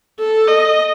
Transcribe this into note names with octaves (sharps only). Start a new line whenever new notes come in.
A4
D#5